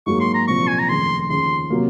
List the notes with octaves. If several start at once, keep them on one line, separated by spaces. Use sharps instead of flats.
G#2 F#3 A#3 C#6
C6
A#5
C2 A#2 F3 C4 C#6
G#5
A#5
F1 D#2 C#3 C6
D#2 C#3 F3 C6
C3 F#3 A#3